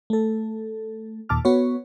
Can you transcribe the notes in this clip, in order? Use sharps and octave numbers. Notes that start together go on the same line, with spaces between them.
A3 A4
D#2 A#2 A5 D6 F6
B3 F#4 B4 C#5